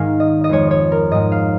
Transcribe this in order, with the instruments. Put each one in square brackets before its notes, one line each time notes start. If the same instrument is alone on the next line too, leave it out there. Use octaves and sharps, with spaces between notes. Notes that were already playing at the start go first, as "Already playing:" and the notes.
Already playing: [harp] G#2 D#3 G#3 F5 G#5
D#5
D#5
F2 F3 G#3 C#5
C#5
A#4
G#2 G#3 D#5
F5